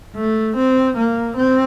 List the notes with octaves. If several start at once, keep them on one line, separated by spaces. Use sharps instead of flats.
A3
C4
A#3
C4